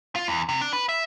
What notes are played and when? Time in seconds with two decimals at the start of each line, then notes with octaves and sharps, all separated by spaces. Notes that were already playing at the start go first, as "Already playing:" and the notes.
0.15 F4
0.28 E2
0.49 C3
0.61 D4
0.73 B4
0.89 E5